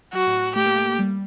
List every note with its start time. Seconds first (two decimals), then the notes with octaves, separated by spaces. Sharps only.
0.13 F#3 F#4
0.27 A2
0.56 A3 G4
0.66 A#3
0.75 A3
0.99 G3